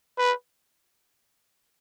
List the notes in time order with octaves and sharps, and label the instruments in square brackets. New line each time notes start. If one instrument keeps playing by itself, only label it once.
[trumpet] B4